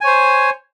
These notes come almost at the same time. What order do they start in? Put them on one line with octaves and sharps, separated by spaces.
G#5 C#5 C5